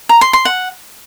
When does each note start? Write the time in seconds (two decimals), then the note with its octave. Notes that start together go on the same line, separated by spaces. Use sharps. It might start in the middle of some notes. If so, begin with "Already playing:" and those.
0.09 A#5
0.21 C6
0.33 C6
0.45 F#5